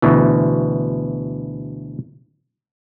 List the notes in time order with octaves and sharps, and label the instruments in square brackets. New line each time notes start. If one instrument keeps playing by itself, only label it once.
[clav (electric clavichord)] D2 B2 E3